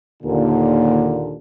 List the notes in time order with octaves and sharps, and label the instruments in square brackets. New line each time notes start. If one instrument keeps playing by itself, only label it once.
[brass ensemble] D#2 A#2 D3